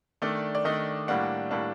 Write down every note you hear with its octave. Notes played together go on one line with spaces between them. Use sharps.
D#3 A3 D4 D5
D5
D#3 A3 D4 D#5
A2 G3 A#3 D4 F#5
A2 G3 A#3 D4 A5